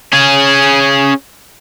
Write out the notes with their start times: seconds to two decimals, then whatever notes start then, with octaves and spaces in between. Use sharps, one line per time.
0.13 C#4 G#4